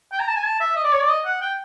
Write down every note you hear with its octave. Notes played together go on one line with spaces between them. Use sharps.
G5
A#5
A5
G#5
A5
E5
D#5
D5
C#5
D5
D#5
F#5
G5